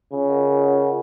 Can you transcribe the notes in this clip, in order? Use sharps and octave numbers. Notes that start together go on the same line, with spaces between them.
C#3 F4
A#4 D#5 F#5
F4
A#4 D#5 F#5
F4